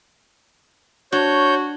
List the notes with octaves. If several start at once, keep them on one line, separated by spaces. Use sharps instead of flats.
D4 F#4 C#5 G6